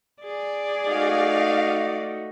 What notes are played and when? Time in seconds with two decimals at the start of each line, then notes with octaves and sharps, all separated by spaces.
0.24 G#4 D5
0.87 A3 D#4 F#4 F5